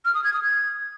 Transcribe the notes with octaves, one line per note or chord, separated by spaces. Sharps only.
F6
D#6
G#6
D#6
G#6